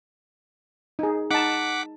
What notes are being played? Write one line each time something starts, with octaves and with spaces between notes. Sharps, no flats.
D#4 G#4
D#4 F#5 A5 D6 B6